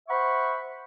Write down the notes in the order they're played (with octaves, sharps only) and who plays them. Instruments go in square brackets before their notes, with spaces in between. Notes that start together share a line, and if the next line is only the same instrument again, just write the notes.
[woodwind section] C5 E5 F#5 B5 C#6